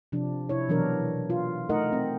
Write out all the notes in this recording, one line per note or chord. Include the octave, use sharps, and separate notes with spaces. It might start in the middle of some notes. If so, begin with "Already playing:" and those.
C3 F3 D4
C3 E4 C#5
B2 E3 F#3 D4 A#4
F4
A3 D#4 A#4 D#5 F#5
C4